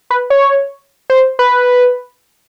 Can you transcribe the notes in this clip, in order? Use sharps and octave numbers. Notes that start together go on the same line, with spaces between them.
B4
C#5
C5
B4